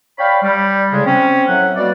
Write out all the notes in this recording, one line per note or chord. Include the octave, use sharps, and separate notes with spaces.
C#5 D5 F5 G5 B5
G3
A2 C#3 G3 G#3
C4 C#4
A2 F#3 E5 F#5
B2 G3 A#3 F#4 D5